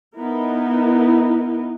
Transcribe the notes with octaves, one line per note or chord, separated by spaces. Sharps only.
B3 D#4 E4 A#4